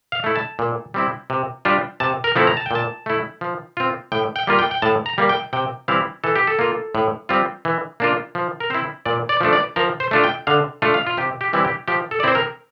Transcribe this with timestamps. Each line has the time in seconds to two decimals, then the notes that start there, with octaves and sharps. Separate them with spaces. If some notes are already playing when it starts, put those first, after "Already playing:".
0.12 F5
0.24 A3 E4
0.36 A5
0.59 A#2
0.94 G3 C4 E4
1.30 C3
1.65 G3 D4 F4
2.00 C3 A5
2.24 A#4
2.36 F3 A3 C4 E4
2.47 A#5
2.57 A5
2.66 G5
2.71 A#2 A5
3.06 A3 E4
3.41 F3
3.77 C4 F4
4.12 A2 G5
4.36 G5
4.47 G3 A#3 F4
4.59 G5
4.71 G5
4.82 A2 A5
5.06 A#5
5.18 G3 A#3
5.29 G5
5.53 C3 G5
5.88 E3 G3 C4 E4 F5
6.24 E3 A4
6.36 G4
6.47 A4
6.59 A#3 F4
6.95 A2
7.29 G3 C4 F4
7.65 E3
8.00 A#3 D4 F4
8.35 F3
8.60 A#4
8.70 C4 E4 C5
9.06 A#2 D5
9.29 D5
9.41 F3 A3 D4
9.53 D5
9.76 F3 A#4
10.00 C5
10.11 A3 D4 F4
10.24 G5
10.47 D3 F5
10.82 A3 D4 F4
10.94 F5
11.07 F4
11.17 C3 G4
11.41 G4
11.53 E3 G3 C4 E4
11.65 G4
11.88 F3 G4
12.11 A4
12.20 D5
12.23 C4 E4 C5
12.35 A#4